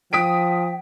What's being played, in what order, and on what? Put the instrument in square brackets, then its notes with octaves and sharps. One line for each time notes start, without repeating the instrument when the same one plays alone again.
[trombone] F3 [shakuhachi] G5 [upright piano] D#6 B6 D7